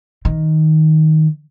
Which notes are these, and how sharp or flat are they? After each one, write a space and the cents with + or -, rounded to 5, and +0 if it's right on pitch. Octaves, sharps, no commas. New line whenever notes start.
D#3 +10